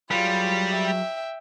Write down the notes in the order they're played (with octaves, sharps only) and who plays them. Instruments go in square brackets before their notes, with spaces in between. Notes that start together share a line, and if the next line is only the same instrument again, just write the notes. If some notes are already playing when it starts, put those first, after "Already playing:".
[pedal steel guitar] F#3 G#4 B4 [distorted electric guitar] G3 [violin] F4
[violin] E5 G5